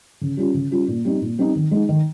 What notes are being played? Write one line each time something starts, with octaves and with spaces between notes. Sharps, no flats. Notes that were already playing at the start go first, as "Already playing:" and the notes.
C#3
G3 C#4 F4
C#3
G3 C#4 F4
A#2
G3 C4 D#4
A#2
G3 C4 D#4
D#3
G#3 D#4
D#3